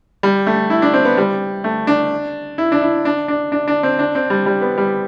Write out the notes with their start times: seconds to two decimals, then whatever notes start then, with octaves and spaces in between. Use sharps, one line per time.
0.23 G3
0.47 A3
0.70 E4
0.82 D4
0.94 C4
1.05 B3
1.17 G3
1.64 A3
1.87 D4
2.58 E4
2.72 D4
2.82 E4
3.05 D4
3.28 D4
3.52 D4
3.68 D4
3.83 C4
3.99 D4
4.15 C4
4.30 G3
4.46 G3
4.62 B3
4.78 G3